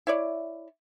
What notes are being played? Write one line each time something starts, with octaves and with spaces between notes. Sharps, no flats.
E4 C#5 D5